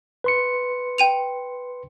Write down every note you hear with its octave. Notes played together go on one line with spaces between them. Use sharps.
B4 C6 C#7
G5 D#7 F7